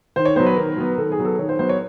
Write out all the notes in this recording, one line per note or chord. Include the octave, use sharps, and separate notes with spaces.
D#3 C5
C#5
F#3 B3 C5
B4
D#3 A#4
F#3 B3
D#3 A4
G#4
F#3 B3
A4
D#3 C#5
C5
F#3 B3 C5
C#5